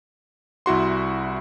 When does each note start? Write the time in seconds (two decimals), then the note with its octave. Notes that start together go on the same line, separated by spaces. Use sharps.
0.66 C2 E4 F#4 C6